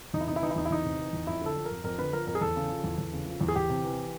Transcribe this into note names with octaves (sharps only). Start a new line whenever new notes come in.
E2 D#4
E4
C3 D#4
E4
E3 D#4
E4
E2 D#4
E4
E2 D#4
C3
E3
E2
F2 E4
D3 A4
F3
A#4
F2
F2 A#4
D3 B4
F3 A#4
F2 A#4
G#4
E2 A4
C#3
F3
E2
E2
C#3
F3
E2
G#4
E2 G4
C3
E3